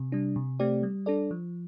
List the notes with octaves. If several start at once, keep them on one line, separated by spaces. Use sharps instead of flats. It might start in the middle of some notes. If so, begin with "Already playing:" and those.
Already playing: C3
G3 D4
C3
A3 C4 G4 D5
G3
D4 A4 D5
F3